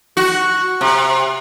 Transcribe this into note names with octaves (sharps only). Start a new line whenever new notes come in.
F#4
C3